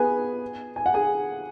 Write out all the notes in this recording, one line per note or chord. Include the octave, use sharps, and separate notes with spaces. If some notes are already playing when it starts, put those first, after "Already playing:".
Already playing: B3 G#4 B4 G#5
G#5
F#5
G#4 G#5